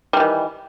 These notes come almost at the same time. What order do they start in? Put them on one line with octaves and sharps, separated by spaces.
G3 E3 D#3